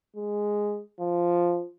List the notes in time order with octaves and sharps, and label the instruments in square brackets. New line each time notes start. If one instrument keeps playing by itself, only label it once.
[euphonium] G#3
F3